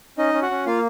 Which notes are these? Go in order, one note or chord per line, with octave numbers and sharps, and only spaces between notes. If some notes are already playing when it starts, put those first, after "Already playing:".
C#4 D#4 D#5
C#4
F#4 F#5
C#4
A#3 F4 F5